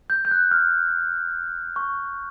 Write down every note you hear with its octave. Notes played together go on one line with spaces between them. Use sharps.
G6
G6
F#6
F6
C#6